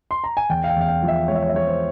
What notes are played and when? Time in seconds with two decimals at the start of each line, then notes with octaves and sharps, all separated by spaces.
0.11 C6
0.24 A#5
0.37 G#5
0.49 E2 G5
0.64 F5
0.69 G5
0.76 E2 F5
0.89 G5
1.02 F3
1.08 E5
1.28 G#3 C#5
1.35 E5
1.42 C#5
1.49 E5
1.54 F3 C#5
1.67 C5